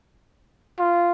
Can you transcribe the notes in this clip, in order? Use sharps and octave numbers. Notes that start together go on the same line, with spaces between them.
F4